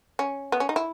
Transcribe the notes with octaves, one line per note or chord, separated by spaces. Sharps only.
C#4
B3
C#4
D#4
E4